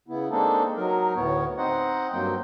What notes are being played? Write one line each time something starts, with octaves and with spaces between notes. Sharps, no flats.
C#3 B3 E4
G#3 A#3 C4 D4 D#4 A4
F#3 D#4 A#4
D2 A2 B3 C#5
C4 D#4 C5 D#5 F#5
G2 F#3 A#3 C4 G5